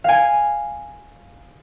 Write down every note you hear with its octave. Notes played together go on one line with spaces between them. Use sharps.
F5 G#5